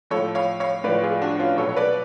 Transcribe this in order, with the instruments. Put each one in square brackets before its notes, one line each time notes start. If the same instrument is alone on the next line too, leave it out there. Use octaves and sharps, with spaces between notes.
[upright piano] A2 F3 A4 C#5
C#5 F5
C#5 F5
A2 B4 D5
F3
F4 G#4
D4 F#4
C#4 F4
B2 F#3 A4 C#5
C#5
B4 D5